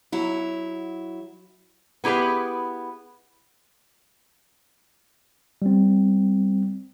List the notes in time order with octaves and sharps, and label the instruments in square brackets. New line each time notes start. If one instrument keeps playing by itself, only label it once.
[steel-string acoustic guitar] F#3 E4
[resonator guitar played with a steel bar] B3 E4 G4 G#4 B4
[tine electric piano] G3 C4